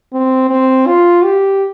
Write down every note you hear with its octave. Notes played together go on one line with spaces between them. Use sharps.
C4
C4
F4
G4